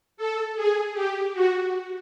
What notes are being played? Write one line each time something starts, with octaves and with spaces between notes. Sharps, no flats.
A4
G#4
G4
F#4